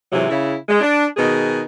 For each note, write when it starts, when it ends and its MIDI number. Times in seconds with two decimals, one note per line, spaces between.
0.12 0.28 44
0.12 0.28 48
0.12 0.28 52
0.12 0.28 54
0.29 0.54 49
0.29 0.54 64
0.69 0.79 56
0.81 1.05 62
1.17 1.62 47
1.17 1.62 51
1.17 1.62 63
1.17 1.62 68